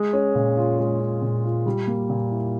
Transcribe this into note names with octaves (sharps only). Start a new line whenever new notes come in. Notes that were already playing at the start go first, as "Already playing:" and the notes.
Already playing: G#3
C#4
A#2
F4
G#3
C#4
A#2
F4
G3
A#3
A#2
E4